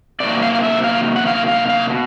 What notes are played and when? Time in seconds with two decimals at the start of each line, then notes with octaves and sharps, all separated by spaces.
0.20 C3 D#3 F#3 A#3 D5
0.42 F5
0.64 E5
0.84 F5
1.16 F#5
1.27 F5
1.48 F5
1.69 F5
1.90 B2